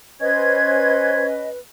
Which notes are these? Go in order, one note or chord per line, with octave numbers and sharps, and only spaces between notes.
C#4 B4 C5 D#5 G#6